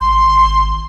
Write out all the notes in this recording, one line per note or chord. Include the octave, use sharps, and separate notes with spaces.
G#1 C6